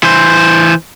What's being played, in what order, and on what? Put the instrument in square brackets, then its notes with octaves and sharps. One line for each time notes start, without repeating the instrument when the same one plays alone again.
[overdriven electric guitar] E3 C5